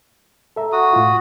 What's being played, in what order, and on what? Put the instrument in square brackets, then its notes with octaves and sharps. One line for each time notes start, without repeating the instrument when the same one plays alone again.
[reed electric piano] A4 E5 A#5
[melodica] F#4 D#6
[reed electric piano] A2 F4